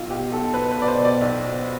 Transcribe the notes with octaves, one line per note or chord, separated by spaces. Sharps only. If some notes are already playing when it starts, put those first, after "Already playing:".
Already playing: B1 F4
B2 G4
B1 A4
B2 B4
B4
B2
D5
C5
B2
D5
B1
B2